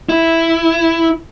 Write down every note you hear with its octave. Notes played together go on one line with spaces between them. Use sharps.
E4